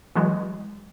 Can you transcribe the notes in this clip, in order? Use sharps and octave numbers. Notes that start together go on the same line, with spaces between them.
E3 F#3 G#3